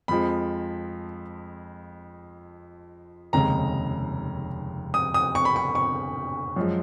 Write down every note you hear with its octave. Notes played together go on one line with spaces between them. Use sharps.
F2 F3 G#3 B5
F1 D#2 C#3 G#3 A#5
D#6
D#6
C#6
B5
C#6
C#6
F#2 F3 G#3